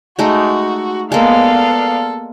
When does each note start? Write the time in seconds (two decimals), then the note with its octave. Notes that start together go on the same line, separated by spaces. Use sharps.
0.19 G#3 A3 D#4 F#4
1.12 G#3 A#3 B3 A4 D5 F5